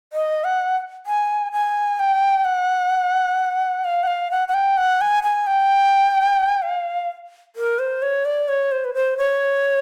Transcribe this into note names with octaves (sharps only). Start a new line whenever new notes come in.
D#5
F#5
G#5
G#5
G5
F#5
F5
F#5
F5
F#5
F#5
G5
F#5
G#5
G#5
G5
F5
A#4
C5
C#5
D5
C#5
C5
B4
C5
C#5